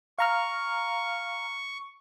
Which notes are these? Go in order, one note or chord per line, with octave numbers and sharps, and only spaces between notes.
F5 A#5 C#6 F6